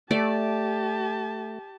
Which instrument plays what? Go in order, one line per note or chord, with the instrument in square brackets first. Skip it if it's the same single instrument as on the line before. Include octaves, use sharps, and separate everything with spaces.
[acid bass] A3 [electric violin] G4 A5 [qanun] D5